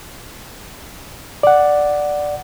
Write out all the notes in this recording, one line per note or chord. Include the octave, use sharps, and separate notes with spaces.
D5 F#5